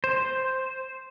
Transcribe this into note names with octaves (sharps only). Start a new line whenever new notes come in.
C5